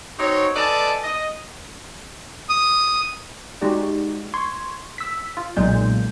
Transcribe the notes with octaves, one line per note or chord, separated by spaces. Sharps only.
C4 D#4 F#4 C#5
A4 B4 D5 D#5 G#5 A5
D#5
D#6
G#3 D#4 F#4 G4 D5
C6 C#6 G#6
E6 B6
F4
B1 A#2 C#3 G#3 F4 G6